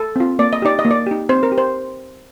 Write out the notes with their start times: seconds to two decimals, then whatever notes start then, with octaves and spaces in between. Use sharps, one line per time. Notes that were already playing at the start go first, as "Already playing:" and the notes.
Already playing: A4
0.16 C4 F4
0.39 A#3 D5
0.53 D#5
0.62 D#4 G4 D5
0.79 D#5
0.85 A#3
0.91 D5
1.07 D#4 G4
1.29 C4 C5
1.43 A#4
1.52 G4
1.58 C5